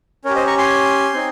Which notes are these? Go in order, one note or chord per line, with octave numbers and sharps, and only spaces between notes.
C#4 G4 A#4 C#5
C5 D#5
A#5 C#6
G#5 C6
C4 D#4